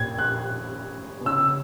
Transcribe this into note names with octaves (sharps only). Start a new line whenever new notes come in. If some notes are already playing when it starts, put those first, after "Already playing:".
Already playing: A#2 G#6
F#6
B2
C#3 E6